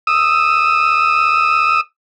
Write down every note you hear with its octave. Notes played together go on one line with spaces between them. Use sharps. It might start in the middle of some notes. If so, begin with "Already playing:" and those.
D#6 E6